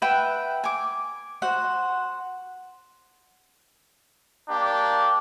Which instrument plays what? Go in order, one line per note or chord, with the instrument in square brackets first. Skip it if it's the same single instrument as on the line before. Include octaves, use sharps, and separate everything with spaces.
[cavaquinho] B4 E5 F#5 G5
G#5 D6
F#4 C5 F#5
[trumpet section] A#3 D4 G4